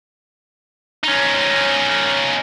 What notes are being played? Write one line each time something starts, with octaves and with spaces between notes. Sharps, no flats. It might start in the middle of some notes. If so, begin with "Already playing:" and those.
C#4 D#4